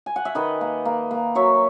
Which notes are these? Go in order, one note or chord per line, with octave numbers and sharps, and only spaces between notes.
G#5
F#5
E5
D#3 B4 D#5
A#3
A#3
A#3
F#3 C#5 E5